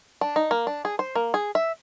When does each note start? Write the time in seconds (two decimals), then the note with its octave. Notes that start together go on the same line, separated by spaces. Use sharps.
0.21 D4
0.36 D#4
0.51 A#3
0.67 D4
0.85 G#4
0.99 C5
1.15 A#3
1.34 G#4
1.55 E5